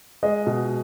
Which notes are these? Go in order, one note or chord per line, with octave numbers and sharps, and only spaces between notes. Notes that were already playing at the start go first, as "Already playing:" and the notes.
G#3 D#5
B2